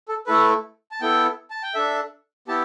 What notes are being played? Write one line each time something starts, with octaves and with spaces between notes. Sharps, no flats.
A4
A3 E4 A4 B4
A5
B3 E4 A4 G5
A5
G5
D4 A4 E5
B3 E4 G4 A5